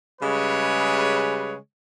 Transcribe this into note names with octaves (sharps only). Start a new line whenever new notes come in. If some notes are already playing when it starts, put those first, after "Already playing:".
C#3 G3 G#3 B4 C#5